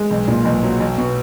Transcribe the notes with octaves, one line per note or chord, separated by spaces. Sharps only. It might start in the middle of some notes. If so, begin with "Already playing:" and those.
Already playing: G#3
B1
A#2
B1
F#3
B1
B2